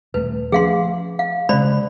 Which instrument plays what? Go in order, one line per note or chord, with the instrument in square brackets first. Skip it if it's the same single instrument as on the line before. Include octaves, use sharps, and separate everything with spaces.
[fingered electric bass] D#1 A3 [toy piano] B4
[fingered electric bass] F3 A3 C#4 [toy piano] G#4 F5 C6
[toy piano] F5
[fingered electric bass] C#3 G#3 [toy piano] C5 D5 B5